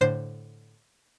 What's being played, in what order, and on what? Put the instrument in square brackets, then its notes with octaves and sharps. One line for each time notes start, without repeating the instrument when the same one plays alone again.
[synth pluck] A2 D3 C5 C7